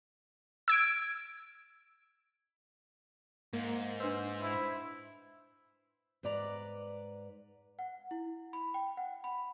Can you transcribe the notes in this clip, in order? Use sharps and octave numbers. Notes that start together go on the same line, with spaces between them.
E6 G#6 D7
G#2 A#3
D4 B4 C5 E6
E4
G#2 B4 D5 A#5
F#5
E4
B5
G5
F#5
B5